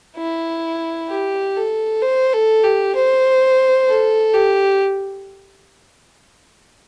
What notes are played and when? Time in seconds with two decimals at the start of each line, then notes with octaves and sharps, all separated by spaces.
0.17 E4
1.09 G4
1.56 A4
2.02 C5
2.33 A4
2.64 G4
2.96 C5
3.88 A4
4.34 G4